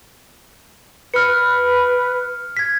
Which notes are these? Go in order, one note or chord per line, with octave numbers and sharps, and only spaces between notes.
B4 F6 C#7
G#6 B6